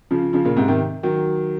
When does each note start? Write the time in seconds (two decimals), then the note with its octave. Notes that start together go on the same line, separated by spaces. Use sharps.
0.11 C#3 F3
0.33 C#3 F3
0.45 A#2 C#3
0.57 G#2 C3
0.68 C3 D#3
1.03 D#3 F#3